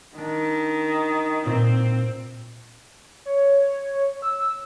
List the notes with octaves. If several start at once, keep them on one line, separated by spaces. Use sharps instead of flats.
D#3 D4
A#2 C4
C#5
E6